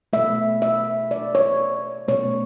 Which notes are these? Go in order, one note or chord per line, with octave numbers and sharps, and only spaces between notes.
B2 A3 E5
E5
D5
C#5
B2 A3 C#5